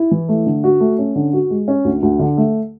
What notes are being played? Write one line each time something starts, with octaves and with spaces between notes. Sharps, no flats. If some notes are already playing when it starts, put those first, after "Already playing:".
Already playing: E4
E3
A3
D3
F#4
A3
C#4
D3
F#4
G#3
C#4
D2
D2
D3
A3